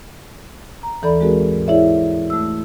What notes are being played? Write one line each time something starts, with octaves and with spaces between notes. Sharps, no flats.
A#5
D#2 E3 A4 D5 B5
G#3 C4 F#4 G#4 A#4
G#2
E4 G#4 C#5 D5 E5
A3 E6